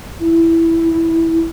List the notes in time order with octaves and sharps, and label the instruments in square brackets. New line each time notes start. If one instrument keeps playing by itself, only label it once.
[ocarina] E4